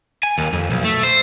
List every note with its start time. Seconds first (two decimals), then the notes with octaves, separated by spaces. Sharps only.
0.23 G#5
0.38 D#2
0.53 F2
0.71 B1
0.84 A3
1.03 C5